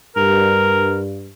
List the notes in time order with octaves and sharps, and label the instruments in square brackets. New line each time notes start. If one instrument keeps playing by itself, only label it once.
[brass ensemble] G2 [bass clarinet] A#4